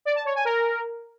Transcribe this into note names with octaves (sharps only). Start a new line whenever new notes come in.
D5
A5
C#5
G#5
A#4